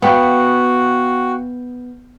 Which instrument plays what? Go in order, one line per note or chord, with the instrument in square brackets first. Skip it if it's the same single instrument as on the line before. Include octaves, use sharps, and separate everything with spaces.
[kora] B3 [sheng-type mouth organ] F#4 [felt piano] F5 G5